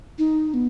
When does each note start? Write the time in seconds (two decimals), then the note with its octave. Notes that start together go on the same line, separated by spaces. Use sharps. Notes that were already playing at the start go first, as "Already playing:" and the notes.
0.18 D#4
0.54 B3